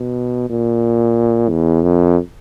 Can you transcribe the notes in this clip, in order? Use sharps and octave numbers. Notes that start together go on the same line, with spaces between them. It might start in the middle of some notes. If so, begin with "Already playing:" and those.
Already playing: B2
A#2
E2
F2